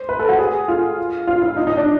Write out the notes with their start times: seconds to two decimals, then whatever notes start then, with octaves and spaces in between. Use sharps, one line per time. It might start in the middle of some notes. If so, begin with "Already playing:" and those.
Already playing: C5
0.09 B4
0.19 A4
0.29 F#4
0.39 G#4
0.68 F4
1.27 F4
1.42 E4
1.57 D#4
1.67 D#4
1.77 D4